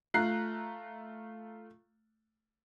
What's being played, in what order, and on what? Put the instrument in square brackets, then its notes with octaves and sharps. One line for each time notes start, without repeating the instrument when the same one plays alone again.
[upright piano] A3 F4 A#5 F#6 C7